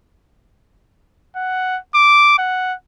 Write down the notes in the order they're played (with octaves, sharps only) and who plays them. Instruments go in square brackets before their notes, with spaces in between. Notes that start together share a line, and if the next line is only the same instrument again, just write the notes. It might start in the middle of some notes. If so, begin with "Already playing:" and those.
[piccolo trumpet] F#5
D6
F#5